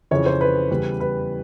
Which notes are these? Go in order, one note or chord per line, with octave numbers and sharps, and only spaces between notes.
F2 C#3 E3 C#5
C5
B4
E2 C#3 E3 G3
B4